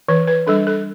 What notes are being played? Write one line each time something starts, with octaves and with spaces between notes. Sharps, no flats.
E3 B4
B4
G3 D4 A4
A4